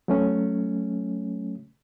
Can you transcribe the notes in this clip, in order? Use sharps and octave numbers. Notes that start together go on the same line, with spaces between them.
F#3 A3 C#4